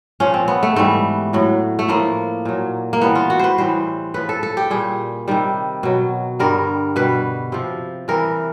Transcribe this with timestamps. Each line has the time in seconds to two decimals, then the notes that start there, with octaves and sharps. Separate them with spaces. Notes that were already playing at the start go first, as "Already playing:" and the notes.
0.20 A#2 F3 C#4
0.34 C4
0.48 B3
0.63 A3
0.76 G#2 E3 G3 A3
1.33 A2 F#3
1.79 A3
1.88 A2 F3 A#3
2.45 A#2 F#3
2.93 A#3
3.01 A2 E3 G3 B3
3.15 F4
3.30 F#4
3.39 B4 C5
3.58 A2 E3 G3 C5
4.14 A2 F3 B4
4.29 A4
4.43 A4
4.57 G4
4.70 A#2 G3 G#4
5.28 C3 D#3 G3
5.83 B2 F#3
6.40 G2 D3 G3 A#4
6.96 B2 G3 B4
7.52 C3 F3
8.08 C3 E3 G3 A#4